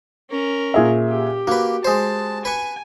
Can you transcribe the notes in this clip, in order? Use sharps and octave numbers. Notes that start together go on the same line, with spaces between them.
C#4 A#4
A#2 G#4 E5
G4
A#3 F#4 B4
G#3 C5 A5
B4 G#5 C#6